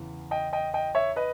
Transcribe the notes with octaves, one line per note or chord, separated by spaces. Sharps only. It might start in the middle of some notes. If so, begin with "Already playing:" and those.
Already playing: E2 C#3 E3
D#5 G5
D#5 G5
D#5 G5
C#5 E5
B4 D#5